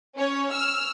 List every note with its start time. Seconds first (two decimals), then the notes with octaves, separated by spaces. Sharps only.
0.16 C#4 C#5
0.53 E6 F6